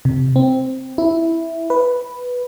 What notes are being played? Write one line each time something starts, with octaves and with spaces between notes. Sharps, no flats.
C3
C4
E4
B4